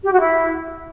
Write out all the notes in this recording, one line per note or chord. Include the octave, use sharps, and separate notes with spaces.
G4
F#4
E4